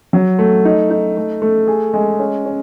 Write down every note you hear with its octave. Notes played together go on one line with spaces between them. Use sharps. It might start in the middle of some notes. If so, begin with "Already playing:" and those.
F#3
A3
D#4
D#4
A3
A3
G#4
G#3
C#4
C#4